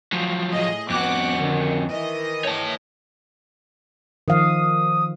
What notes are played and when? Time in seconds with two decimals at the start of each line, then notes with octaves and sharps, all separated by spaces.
0.13 F3 F#3
0.52 A2 G#4 D#5
0.90 F2 B3 F#4 D6 F#6
1.37 D3 D#3
1.88 D#3 E3 D#5
2.45 C#5 A5
4.28 D#3 F3 F5 D#6